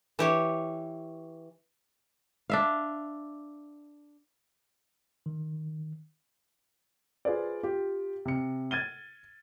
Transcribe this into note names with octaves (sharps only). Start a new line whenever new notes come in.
E3 G4 C#5
D4 E5 F5
D#3
F4 G#4 B4 C5 D5
F4 G4
C3 C#7
G#6 A6 D#7 G7